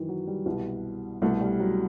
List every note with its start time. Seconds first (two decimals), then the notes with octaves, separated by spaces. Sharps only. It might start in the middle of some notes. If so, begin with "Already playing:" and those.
Already playing: F#2 D#3 E3
0.08 F#3
0.27 G3
0.46 C2 B2
1.22 C2 A3
1.25 B2
1.41 G3
1.60 F#3